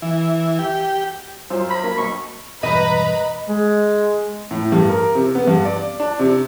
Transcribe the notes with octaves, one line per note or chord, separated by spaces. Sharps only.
E3
G4
F#2 F4 C5
B5
A#3
B1 C#6
E1 G2 B4 D#5 A#5 B5
G#3
A2
G2
A#4
C3
B3
G2
D5
D4
C3